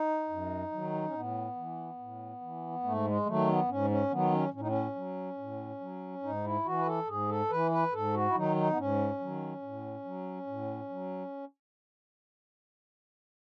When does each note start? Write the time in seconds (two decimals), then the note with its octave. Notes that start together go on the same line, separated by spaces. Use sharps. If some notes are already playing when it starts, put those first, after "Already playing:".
Already playing: D#4
0.29 F#2
0.72 D#3 F#3
1.05 C#4
1.14 A2 B3
1.56 E3
1.99 A2
2.41 E3
2.84 G#2 A3
3.05 G#3
3.26 D#3 F#3 A3
3.47 B3
3.68 G#2 C#4
3.90 C#4
4.10 D#3 F#3 B3
4.32 C#4
4.53 A2 C#4
4.60 D#4
4.68 C#4
4.96 F#3
5.38 A2
5.81 F#3
6.23 G#2 D#4
6.44 E4
6.65 E3 F#4
6.78 B4
6.86 A4
7.08 G#2 G#4
7.29 A4
7.50 E3 B4
7.71 B4
7.93 G#2 A4
8.14 F#4
8.28 E4
8.35 D#3 F#3 D#4
8.56 D#4
8.70 B3
8.77 G#2 C#4
9.20 D#3 F#3
9.62 A2
10.05 F#3
10.47 A2
10.89 F#3